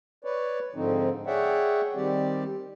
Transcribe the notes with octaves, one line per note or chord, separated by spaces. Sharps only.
B4 C#5 D5
G#2 D3 F3 C4 D#4
G#4 C#5 D5 E5 F#5 G5
D#3 G3 C4 G4 D5